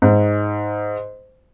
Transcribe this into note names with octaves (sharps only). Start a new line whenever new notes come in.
G#2